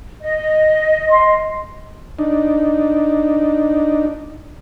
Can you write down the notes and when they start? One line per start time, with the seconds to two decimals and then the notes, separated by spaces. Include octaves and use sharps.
0.21 D#5
1.09 C6
2.19 D4 D#4